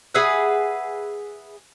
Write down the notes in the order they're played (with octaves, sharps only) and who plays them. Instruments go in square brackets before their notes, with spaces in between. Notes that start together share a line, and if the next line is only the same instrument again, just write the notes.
[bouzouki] G#4 B4 E5 F#5